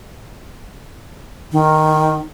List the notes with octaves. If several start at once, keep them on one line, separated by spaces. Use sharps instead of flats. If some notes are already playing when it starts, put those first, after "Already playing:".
D#3